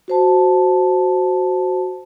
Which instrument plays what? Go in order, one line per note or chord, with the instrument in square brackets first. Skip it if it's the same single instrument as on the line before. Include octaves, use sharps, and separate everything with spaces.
[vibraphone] F#4 C5 A5